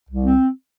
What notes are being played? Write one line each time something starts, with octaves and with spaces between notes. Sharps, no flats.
C2
C4